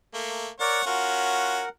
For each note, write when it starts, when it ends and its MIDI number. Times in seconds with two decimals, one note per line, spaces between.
0.14 0.48 57
0.14 0.48 58
0.60 0.82 70
0.60 0.86 73
0.60 0.82 74
0.60 0.86 78
0.86 1.62 61
0.86 1.62 65
0.86 1.62 66
0.86 1.69 70
0.86 1.69 78